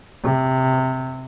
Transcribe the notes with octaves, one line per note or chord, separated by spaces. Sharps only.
C3